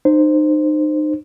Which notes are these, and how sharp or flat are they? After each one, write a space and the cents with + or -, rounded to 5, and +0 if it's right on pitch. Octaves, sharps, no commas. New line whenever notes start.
D#4 -35 C5 +0